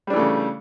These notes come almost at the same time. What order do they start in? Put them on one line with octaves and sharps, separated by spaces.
G3 D4 E3 A3 C#3